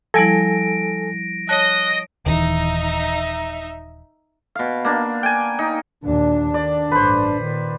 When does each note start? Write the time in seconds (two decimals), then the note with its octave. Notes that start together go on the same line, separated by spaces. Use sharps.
0.14 F3 G3 E4 A4 G#5 A#6 D7
1.49 C#5 D#5 A5 F#6
2.26 D#1 D#3 E3 D#4 E5
4.55 B2 F5
4.85 A#3 D4
5.23 G5 G#5
5.59 D#4
6.04 D#2 A#2 D4
6.54 D#3 D5
6.91 A1 G2 B4 C5
7.38 A#2 D#3